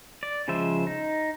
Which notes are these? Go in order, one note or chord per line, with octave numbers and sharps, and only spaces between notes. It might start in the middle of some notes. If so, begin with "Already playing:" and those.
D5
C#3 F3 G#3 C5 E5
D#4